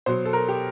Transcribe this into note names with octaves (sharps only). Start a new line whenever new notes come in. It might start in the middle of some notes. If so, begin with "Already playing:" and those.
B2 F#3 C5
A4
A#4
G4